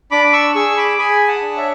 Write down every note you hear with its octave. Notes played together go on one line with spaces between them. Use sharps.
D4 B5 D6
C#6 E6
G#4 C#6 E6
B5 D6
G#4 G#5 B5
F#5 A5
D4
C#5 E5